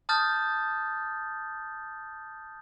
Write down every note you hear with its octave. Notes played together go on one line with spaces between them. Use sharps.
A5 D#6 F6 G6 A6